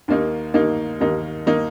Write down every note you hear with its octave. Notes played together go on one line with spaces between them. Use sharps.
D#2 D#3 A#3 D#4
D#2 D#3 A#3 D#4
D#2 D#3 A#3 D#4
D#3 A#3 D#4